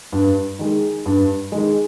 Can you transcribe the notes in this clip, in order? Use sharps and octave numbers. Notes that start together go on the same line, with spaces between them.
G2
D#3 G#3
G2
D#3 G#3